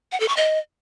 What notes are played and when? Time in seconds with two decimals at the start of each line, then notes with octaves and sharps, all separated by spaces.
0.12 F#5
0.20 A4
0.28 C#6
0.37 D#5